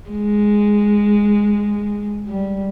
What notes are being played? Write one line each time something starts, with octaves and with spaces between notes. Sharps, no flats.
G#3
G3